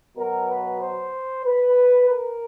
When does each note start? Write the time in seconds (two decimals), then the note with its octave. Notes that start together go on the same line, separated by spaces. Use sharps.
0.17 B2 F#3 B3 A#4
0.49 B4
0.81 C5
1.46 B4
2.10 A#4